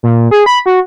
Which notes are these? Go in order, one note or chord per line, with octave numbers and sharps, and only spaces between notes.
A#2
G#4
B5
F#4